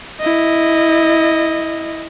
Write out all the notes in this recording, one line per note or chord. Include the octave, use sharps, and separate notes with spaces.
E4 D#5